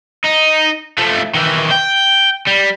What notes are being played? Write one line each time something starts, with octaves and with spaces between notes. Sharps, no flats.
D#4
F3 A3
D#3 E3
G5
G3